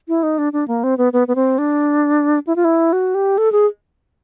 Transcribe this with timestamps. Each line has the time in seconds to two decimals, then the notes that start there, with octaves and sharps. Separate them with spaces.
0.08 E4
0.23 D#4
0.38 D4
0.53 D4
0.68 A#3
0.84 C4
0.98 B3
1.13 B3
1.28 B3
1.35 C4
1.58 D4
2.47 E4
2.56 F4
2.65 E4
2.93 F#4
3.15 G4
3.38 A4
3.52 G#4